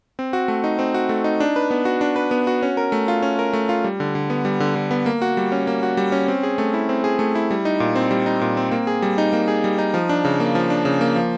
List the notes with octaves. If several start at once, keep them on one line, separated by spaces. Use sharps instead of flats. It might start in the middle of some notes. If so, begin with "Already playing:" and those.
C4
F#4
A3
D#4
C4
F#4
A3
D#4
D4
B4
B3
F#4
D4
B4
B3
F#4
C#4
A#4
A3
F4
C#4
A#4
A3
F4
G3
D3
D3
B3
G3
D3
D3
B3
A#3
F#4
G3
C#4
A#3
F#4
G3
C#4
C4
G#4
A3
E4
C4
G#4
A3
E4
G3
D#4
A#2
C4
G3
D#4
A#2
C4
A#3
G#4
G3
D#4
A#3
G#4
G3
D#4
F3
D4
C#3
A#3
F3
D4
C#3
A#3
F3